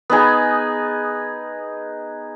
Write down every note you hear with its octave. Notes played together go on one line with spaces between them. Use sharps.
B3 D#4 G#4